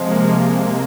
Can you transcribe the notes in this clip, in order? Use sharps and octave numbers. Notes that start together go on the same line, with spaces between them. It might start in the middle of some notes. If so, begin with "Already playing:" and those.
Already playing: C3 F3 G#3
A#3
G#3